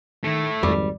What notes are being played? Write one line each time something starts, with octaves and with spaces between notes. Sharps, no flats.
D#3 A3 E4
G#1 F2 G3